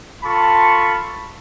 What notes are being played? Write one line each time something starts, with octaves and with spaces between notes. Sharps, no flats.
F4 A4 A5 B5 C#6